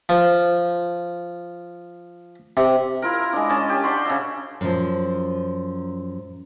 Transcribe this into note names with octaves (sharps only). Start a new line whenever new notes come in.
F3
C3
E4 F4 A#4
G#3 D4
C#4 D#5 A5
G4
D4 F#4 F#5 C6
C#3 D#5 E5
F#2 F3